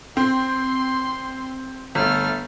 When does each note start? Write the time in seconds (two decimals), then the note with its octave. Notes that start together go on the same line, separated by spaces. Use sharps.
0.17 C4 C6
1.95 G1 A3 F6